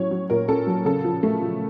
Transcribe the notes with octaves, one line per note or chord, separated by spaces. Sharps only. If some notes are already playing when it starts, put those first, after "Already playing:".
Already playing: A2 F#3 C#4 C#5
F#3
A#2 A#4
C#4 A4
F#3
C#3 A4
F3
A3
F3